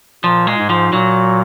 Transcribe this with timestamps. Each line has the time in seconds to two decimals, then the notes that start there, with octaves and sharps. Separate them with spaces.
0.24 A#2 F3
0.47 G#3
0.59 G#2
0.70 F3
0.92 A#2 F#3